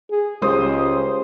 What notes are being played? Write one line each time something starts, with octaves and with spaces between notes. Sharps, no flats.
G#4
C#2 G#3 C#4 G4 C5 D#6